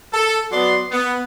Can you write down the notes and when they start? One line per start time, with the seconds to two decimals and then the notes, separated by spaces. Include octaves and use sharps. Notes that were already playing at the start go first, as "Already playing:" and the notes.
0.13 A4
0.51 F#3 B3 D5 C6
0.91 B3